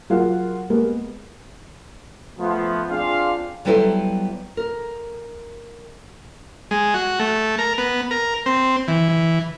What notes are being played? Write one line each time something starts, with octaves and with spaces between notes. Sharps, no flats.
F#3 F4 G#4 A#4 F5 F#5
G#3 A#3 B3 G4 A#4
F3 A3 B3
C4 D4 F4 G#4 F5
F#3 G3 B3 E4 A4 C5
A#4
G#3
F#4
A3
A#4
B3
A#4
C4
E3
E3